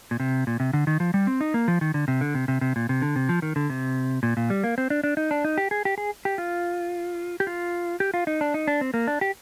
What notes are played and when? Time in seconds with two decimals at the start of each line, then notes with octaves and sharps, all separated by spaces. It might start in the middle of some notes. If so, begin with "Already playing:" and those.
0.11 A#2
0.20 C3
0.47 A#2
0.60 C3
0.73 D3
0.87 D#3
1.00 F3
1.14 G3
1.27 C4
1.41 D#4
1.54 A#3
1.68 F3
1.81 D#3
1.94 D3
2.08 C3
2.21 D3
2.35 C3
2.48 C3
2.61 C3
2.76 A#2
2.89 C3
3.02 D3
3.16 C3
3.29 F3
3.42 D#3
3.56 D3
3.70 C3
4.23 A#2
4.37 A#2
4.50 G3
4.64 A#3
4.78 C4
4.90 D4
5.04 D4
5.17 D#4
5.31 D4
5.44 D#4
5.58 G4
5.71 G#4
5.85 G4
5.98 G#4
6.25 G4
6.38 F4
7.40 G4
7.47 F4
8.00 G4
8.14 F4
8.27 D#4
8.41 D4
8.54 D#4
8.68 D4
8.81 C4
8.94 A#3
9.07 D4
9.21 G4